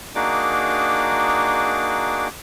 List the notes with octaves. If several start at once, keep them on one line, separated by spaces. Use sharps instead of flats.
A#3 D4 D#4 F#4 G#4 D6